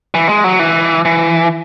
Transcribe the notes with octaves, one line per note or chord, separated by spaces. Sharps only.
E3
G#3
F#3
E3
E3